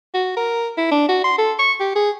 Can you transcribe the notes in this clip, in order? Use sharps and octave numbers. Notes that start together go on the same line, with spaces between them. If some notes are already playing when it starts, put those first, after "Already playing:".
F#4
A#4
E4
D4
F#4
C6
A4
C#6
G4
G#4